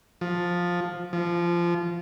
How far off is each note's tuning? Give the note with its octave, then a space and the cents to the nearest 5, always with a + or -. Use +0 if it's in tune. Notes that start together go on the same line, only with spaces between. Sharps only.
F3 +10
F3 -20